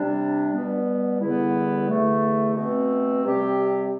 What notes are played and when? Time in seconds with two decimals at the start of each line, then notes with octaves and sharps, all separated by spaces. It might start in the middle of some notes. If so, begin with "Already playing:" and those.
Already playing: C3 G3 D4
0.53 B2 G3 B3
1.21 E2 D3 G3 B3 E4
1.88 E2 D3 A3
2.56 B2 A3 C4
3.24 C3 G3 C4 G4